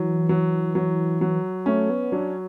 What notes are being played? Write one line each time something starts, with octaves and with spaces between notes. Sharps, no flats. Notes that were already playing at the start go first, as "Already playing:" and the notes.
Already playing: E3 F#3
F#3
F#3
F#3
A3 C#4
B3
F#3 D4